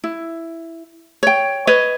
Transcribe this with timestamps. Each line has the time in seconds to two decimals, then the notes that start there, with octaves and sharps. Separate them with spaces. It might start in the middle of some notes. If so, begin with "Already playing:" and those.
0.04 E4
1.23 C#5 G5
1.67 B4 C#5 D#5